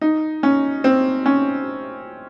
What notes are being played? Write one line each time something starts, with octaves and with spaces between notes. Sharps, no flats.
D#4
C#4
C4
C#4